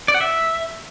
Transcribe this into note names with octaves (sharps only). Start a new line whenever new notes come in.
D5
F#5
E5